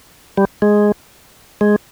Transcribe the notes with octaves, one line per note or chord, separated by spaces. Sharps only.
G3
G#3
G#3